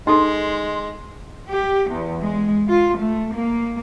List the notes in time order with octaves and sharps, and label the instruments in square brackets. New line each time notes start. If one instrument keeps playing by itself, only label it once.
[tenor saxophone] G#3 [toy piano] D#4 A4 [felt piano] C6
[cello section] G4
E2
G#3
F4
A3
A#3